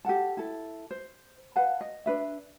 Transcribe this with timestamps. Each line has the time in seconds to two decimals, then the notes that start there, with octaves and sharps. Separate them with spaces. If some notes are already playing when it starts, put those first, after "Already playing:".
0.05 G4 A4 F#5 A5
0.37 E4 A4
0.91 C5
1.56 B4 F5 F#5 A5
1.81 D#5
2.06 D4 B4 E5